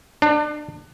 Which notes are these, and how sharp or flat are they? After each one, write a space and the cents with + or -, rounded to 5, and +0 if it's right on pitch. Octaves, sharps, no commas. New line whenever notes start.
D4 +30